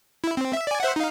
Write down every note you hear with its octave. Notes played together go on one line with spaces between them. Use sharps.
E4
C4
E5
D5 G#5
C5 E5 F#5
D#4 F5